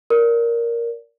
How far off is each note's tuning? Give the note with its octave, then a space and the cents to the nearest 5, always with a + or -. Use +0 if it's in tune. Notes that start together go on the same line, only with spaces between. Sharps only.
A#4 +0 D5 -25